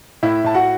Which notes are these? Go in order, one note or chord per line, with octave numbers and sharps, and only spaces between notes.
A2 E4 E5
A2 A5
F#4 F#5